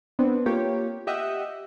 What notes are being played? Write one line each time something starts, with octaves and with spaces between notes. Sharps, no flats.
B3 C4 D4
A#3 F4 G4 C#5
G4 D#5 E5 F#5 G5